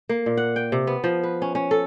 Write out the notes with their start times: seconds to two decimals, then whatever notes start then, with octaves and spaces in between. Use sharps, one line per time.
0.09 A#3
0.26 A#2
0.37 F#5
0.56 G5
0.72 C3
0.87 B3
1.04 F3
1.23 B4
1.42 C#4
1.55 C#4
1.71 A4